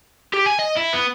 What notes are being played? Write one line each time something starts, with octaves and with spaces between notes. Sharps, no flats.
G4
G#5
D#5
E4
B3